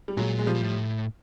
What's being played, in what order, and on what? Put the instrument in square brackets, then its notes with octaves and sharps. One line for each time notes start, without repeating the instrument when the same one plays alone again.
[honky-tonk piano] G3
[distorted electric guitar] A#2 [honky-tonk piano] F#3 G#3
[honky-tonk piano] G#3
F3 G3
[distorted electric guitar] A#2
A2